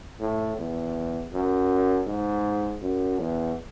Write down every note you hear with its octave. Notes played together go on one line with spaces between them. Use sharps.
A2
E2
F#2
G#2
F#2
E2